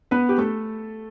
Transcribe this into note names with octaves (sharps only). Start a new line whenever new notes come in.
B3 B4
G4
A3 A4